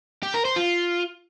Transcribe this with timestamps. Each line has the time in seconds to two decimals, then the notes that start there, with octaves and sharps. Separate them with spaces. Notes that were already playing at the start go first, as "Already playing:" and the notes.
0.23 G4
0.34 A#4
0.45 C5
0.56 F4